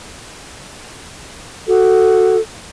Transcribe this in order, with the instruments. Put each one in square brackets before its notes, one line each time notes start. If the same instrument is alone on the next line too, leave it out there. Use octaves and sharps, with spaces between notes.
[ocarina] F#4 [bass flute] A4